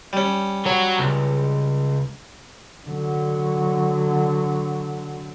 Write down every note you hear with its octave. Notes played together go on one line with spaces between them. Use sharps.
G3 C#4
F#3 C#5
C#2
D3 F#3